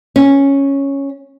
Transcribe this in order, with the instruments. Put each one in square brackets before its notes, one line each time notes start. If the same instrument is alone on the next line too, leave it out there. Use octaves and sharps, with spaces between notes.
[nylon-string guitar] C#4